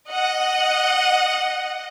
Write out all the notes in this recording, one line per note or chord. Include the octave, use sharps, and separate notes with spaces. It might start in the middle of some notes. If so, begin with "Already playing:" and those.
D#5 F#5